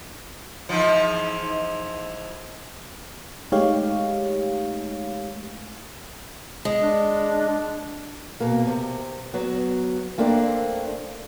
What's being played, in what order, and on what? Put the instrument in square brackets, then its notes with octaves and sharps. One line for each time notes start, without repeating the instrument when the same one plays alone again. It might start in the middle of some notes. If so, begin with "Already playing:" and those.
[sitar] G#2 E3 F3
[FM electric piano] G#3 A3 D#4 G4 C#5 F5
[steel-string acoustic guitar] G#3
[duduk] D4
[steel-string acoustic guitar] B2 A#3
C3
F#3 B3
A3 A#3 C4 D4